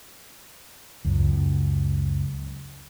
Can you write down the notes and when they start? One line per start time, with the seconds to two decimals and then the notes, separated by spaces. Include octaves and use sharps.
1.05 C#2 F#2